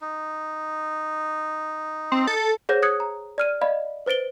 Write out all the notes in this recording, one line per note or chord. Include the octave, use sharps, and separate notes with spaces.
D#4
C4
A4
G#4 C5 C#5 F#5 G6 A#6
D#6 F#6 G#6 C#7
A#5
D5 F6 D#7
D5 D#5 F5 B5
B4 C5 A6 D7 G7